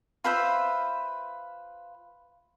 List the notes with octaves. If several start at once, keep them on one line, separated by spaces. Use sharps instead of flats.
F4 B4 C5 E5